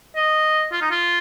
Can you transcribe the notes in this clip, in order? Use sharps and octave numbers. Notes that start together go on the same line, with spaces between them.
D#5
F4
D#4
F4